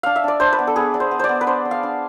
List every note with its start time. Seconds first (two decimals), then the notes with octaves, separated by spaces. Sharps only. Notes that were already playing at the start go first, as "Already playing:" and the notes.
0.03 D4 F5
0.16 E5
0.24 D4 D5
0.40 D4 C5
0.53 B4
0.59 B3
0.67 A4
0.76 B3 G#4
0.94 D4
1.00 C5
1.11 B3
1.19 C5 D5
1.29 B3
1.41 B4
1.47 D4 C5
1.65 D4
1.71 F5
1.83 D4